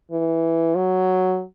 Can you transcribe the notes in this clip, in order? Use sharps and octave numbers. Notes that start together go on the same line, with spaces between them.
E3
F#3